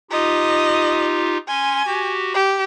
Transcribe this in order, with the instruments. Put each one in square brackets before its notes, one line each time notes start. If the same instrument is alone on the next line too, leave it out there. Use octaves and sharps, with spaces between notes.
[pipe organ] D#4 F4 G4 [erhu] D#5
[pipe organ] C#4 C6 [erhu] G#5
[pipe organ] F#4 G4
[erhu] G4